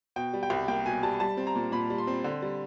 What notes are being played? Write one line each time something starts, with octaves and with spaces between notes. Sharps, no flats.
B2 G5
G3
G5
C2
A#3 G5
B2 G#5
G3 A5
G3 A5
C4
A#5
A#2
A#2 B5
G3
C6
C4
D3
G3